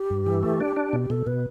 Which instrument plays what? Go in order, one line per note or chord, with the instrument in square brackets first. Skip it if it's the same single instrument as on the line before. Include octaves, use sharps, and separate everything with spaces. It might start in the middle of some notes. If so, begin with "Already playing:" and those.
Already playing: [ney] G4
[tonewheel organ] G2
E3
A3
D4
D4
B2
[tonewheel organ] B2 [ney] A4
[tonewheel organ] B2 [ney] B4